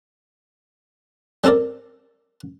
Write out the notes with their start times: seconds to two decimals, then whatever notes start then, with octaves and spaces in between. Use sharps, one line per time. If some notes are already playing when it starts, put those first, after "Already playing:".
1.44 G3 C4 A4 A#4 D5